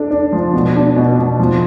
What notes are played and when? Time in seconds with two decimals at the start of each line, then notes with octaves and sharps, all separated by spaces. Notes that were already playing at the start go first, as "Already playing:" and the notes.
Already playing: D4 A4
0.11 D4
0.33 F3
0.53 B2
0.75 D4
0.96 B2
1.18 B2
1.40 F3